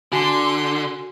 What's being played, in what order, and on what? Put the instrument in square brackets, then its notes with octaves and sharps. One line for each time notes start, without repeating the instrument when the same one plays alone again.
[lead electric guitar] D3 [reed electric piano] F#4 G#5 [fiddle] C6